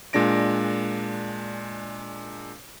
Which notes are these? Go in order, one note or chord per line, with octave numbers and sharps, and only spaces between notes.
A#2 G#3 D4 A#6 D7